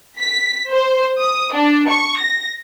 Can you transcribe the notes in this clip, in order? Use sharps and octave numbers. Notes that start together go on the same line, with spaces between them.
B6
C5
D#6
D4
C#6
A#6